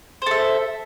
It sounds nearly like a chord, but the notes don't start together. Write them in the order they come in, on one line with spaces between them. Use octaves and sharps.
C5 A4 E5